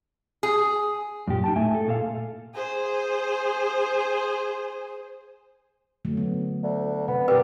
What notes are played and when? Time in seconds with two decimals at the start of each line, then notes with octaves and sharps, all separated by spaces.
0.43 G#4
1.28 F#2 A#2 G4
1.44 D#4 G5 A5
1.56 A2 A3 E5 G#5
1.74 A4
1.88 A#2 A4 F5
2.55 G#4 C5
6.05 D3 F#3 A3
6.17 B3
6.63 D2
7.08 C3 B3
7.28 B2 G4 A#4 B4 D5